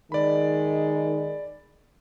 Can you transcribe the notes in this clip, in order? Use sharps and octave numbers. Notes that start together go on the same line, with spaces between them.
D#3 G#3 D5 B5